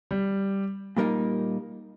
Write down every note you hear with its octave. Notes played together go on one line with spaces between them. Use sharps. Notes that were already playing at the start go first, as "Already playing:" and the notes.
G3
A#2 G3 A#3 D#4